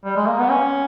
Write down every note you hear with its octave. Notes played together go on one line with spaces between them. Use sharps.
G3
G#3
A#3
B3
C#4